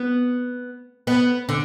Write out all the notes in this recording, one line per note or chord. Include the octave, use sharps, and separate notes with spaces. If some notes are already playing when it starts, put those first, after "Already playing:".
Already playing: B3
B3
D3